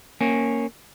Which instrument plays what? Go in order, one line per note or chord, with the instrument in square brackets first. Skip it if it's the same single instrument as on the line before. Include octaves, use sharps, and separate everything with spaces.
[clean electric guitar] A#3 C#4